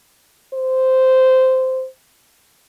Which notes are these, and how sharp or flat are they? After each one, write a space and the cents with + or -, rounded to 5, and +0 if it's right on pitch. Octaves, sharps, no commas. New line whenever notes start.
C5 -10